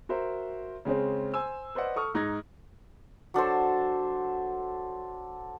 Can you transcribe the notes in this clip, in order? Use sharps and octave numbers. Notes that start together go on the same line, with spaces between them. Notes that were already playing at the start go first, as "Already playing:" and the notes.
F#4 A#4 C5 E5
C#3 G#3 C4 C#4
C5 G#5 E6
B4 C5 D5 D#5 F#5
A4 C#6 D#6 F6
G#2 D#4 F#6 G#6 A#6
F#3 D4 A4 C5